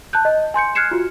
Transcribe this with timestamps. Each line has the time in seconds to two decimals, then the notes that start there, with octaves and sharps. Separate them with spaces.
0.13 A5 F#6 G6
0.25 D#5
0.54 G#5 C6 G6 C#7
0.75 F6 F#6 G#6 C7 C#7 E7
0.91 F4 F#4